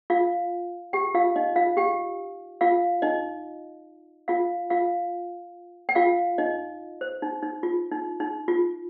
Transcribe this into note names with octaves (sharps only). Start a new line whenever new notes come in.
F4 F5
G4 G5
F4 F5
D#4 D#5
F4 F5
G4 G5
F4 F5
D#4 D#5
F4 F5
F4 F5
G5
F4 F5
D#4 D#5
C5
D#4
D#4
F4
D#4
D#4
F4